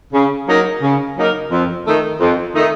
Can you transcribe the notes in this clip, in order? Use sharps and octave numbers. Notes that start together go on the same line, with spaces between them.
C#3
F#3 A#3 D#4 A#4
C#3
F#3 A#3 D#4 A#4
F2
D#3 A3 D#4
F2
D#3 A3 D#4